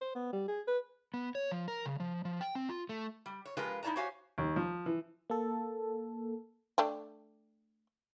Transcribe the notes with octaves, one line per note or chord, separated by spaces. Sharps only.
C5
B3
G3
G#4
B4
B3
C#5
F3
A#4
C#3
F3
F3
G5
C4
F4
A3
G3
C#5
F3 G#3 F4 G4 A#4 B4
D#4 E4 F#4 D5 A5 A#5
F#4 G4 C5 C#5 F5 G#5
D#2
F3
E3
A#3 A4
A3 D4 G5